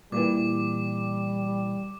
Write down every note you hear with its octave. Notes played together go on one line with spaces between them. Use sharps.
A#2 E3 G3 D6